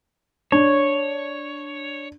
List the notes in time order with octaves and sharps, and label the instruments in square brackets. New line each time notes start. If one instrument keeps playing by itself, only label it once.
[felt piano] D4 [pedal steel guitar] C#5